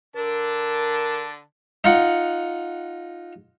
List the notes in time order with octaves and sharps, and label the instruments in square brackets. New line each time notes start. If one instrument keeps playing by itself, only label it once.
[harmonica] D3 D4 A5 [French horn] A#4
[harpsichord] D#4 F4 F#5